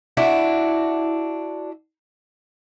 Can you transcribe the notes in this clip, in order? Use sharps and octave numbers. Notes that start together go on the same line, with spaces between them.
D4 E4 F#4